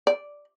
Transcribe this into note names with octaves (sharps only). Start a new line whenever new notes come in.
D5